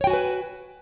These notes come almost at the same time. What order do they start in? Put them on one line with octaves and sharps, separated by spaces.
C#5 G5 F#4 G#5 B4